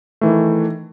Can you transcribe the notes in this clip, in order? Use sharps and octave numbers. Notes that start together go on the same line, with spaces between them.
D#3 E3 A3